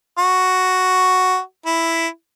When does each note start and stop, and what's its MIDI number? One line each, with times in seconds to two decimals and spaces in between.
0.18 1.39 66
1.66 2.07 64